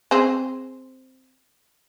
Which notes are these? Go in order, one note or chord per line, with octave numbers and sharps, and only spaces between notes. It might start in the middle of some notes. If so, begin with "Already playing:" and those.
C4 G#4 C5